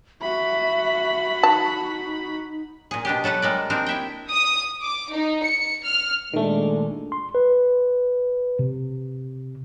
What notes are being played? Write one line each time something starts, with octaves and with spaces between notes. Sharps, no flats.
F#4 E5 B5
D#4 A5
A#2 G#4
B2 D4 G4
F#3 A4 B4 F#5
G3 G#3 A#3 D5
C4 D4 D#4 A#4 C5
E4 E5 G5
D#6
D6
D#4
C#7
F6
A#2 D#3 G#3 A3 D4
C6
B4
C3